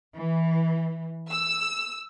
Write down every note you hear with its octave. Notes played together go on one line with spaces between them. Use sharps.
E3
E6